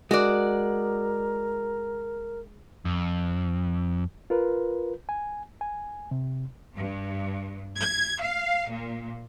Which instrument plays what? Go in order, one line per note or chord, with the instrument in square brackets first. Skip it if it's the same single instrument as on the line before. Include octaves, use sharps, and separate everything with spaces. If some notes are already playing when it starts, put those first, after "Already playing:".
[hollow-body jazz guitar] G#3 [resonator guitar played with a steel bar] F#4 D5 [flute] A#4
[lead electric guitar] F2
[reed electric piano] F4 A#4 B4
G#5
G#5
C3
[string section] G2
G#6
F5
A#2